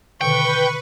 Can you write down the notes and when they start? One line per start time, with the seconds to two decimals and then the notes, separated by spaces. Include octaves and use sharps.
0.21 B2 D3 D#3 B4 G5 C#6